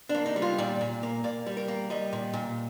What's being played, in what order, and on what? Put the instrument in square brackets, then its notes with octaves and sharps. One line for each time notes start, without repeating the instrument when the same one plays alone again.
[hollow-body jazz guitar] D4
A#3
D#4
G3
F4
A#2 D5
A#2
A#3
A#3 D5
G3
A#4
A#3
G3 D#5
A#2
A#2